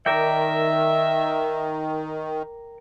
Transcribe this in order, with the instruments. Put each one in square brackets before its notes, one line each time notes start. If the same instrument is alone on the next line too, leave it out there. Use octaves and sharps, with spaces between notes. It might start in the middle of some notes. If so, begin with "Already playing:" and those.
[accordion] D#3 [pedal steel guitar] A#4 D5 G5 [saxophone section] E5